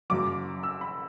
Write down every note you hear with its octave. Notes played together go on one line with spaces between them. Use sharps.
F#1 F#2 F#3 D6
E6
B5